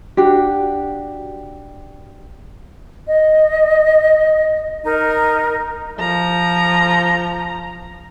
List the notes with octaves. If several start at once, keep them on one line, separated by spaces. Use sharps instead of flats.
D4 F#4 G4
D#5
D#4 A#4
F3 A#5